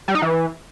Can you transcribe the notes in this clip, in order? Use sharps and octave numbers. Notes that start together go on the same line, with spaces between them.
G3
D#4
E3